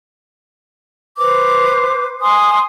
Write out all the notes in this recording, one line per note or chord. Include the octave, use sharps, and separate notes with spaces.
B4 C5 D6
G#5 C6 D#6